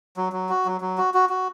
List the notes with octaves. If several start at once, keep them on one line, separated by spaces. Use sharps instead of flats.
F#3
F#3
F#4
F#3
F#3
F#4
F#4
F#4